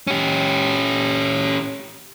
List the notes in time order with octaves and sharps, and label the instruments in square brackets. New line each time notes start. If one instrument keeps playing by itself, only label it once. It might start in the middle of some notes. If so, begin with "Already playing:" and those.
[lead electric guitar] C#4 G4